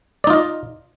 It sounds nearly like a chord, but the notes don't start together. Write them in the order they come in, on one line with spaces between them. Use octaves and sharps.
D5 D#4 F4 D#5